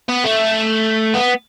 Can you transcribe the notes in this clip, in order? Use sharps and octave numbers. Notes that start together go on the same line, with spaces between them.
B3
A3
B3